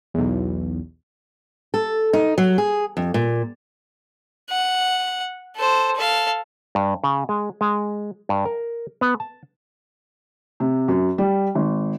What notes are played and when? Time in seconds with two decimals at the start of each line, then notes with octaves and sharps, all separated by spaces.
0.14 B1 E2
1.74 A4
2.13 D#4
2.38 F#3
2.58 G#4
2.97 F2
3.14 A#2
4.50 F#5
5.56 A4 C5
5.96 A4 F5
6.75 G2
7.04 C#3
7.29 G#3
7.61 G#3
8.29 G2
8.46 A#4
9.01 B3
9.20 A5
10.60 C3
10.88 F#2
11.18 G3
11.55 G#1